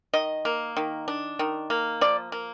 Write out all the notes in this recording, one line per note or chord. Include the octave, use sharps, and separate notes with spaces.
D#3 D#5
A#3
D#3
D4
D#3
A#3
F3 D5
A#3